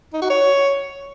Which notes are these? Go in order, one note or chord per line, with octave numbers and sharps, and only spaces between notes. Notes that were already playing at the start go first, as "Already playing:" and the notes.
D#4
F#4
C#5